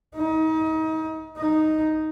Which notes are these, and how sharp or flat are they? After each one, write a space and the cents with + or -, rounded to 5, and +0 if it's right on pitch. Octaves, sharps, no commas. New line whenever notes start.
D#4 +30
D#4 +0